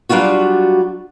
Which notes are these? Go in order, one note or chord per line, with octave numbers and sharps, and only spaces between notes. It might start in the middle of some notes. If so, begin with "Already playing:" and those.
F#3 G3 D4 F4 F#4